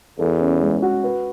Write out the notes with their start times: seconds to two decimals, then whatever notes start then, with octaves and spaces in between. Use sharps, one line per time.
0.19 E2 A4
0.41 C#4
0.61 G#3
0.82 F#4
1.04 B4